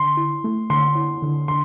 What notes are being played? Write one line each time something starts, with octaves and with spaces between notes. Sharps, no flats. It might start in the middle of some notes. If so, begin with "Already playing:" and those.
Already playing: D3 C6
E4
A3
D3 C6
E4
D3
D3 C6